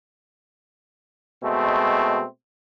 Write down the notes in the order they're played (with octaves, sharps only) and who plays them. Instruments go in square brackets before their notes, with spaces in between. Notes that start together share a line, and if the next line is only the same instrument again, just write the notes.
[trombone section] B2 G#3 A3 C4